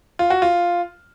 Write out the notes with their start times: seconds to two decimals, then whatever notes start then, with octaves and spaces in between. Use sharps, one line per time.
0.19 F4
0.30 F#4
0.42 F4